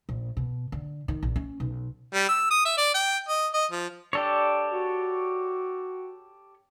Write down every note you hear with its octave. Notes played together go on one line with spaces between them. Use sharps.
A#1
B2
D3
D#3
A#1
C#4
B1
G3
E6
D#6
E5
D5
G5
D#5
D#5
F3
D4 G4 A4 C#5
F#4